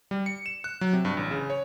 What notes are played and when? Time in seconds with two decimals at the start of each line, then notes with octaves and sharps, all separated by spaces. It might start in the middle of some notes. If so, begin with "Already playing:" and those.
0.11 G3
0.26 C#7
0.46 E7
0.64 F#6
0.81 F#3
0.93 C3
1.05 G2
1.17 A1
1.31 C#3
1.50 C#5